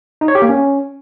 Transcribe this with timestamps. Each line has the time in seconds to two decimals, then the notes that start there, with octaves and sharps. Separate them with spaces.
0.21 D#4
0.28 C#5
0.35 G4
0.42 A#3
0.49 C#4